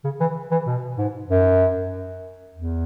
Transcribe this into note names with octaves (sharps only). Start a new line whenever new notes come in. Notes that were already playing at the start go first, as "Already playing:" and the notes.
C#3
E3
E3
B2
G#2
F#2
E2